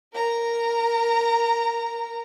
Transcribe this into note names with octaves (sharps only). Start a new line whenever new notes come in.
A#4 A#5